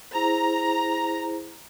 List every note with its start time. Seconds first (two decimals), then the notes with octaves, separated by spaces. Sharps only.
0.13 E4 G#4 C5 A#5